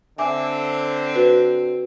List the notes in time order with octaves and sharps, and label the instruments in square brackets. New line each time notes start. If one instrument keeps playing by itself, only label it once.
[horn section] D3 C4 [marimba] E5 G#5 D6
[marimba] F#4 B4